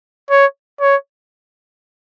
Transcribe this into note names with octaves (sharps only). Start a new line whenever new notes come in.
C#5
C#5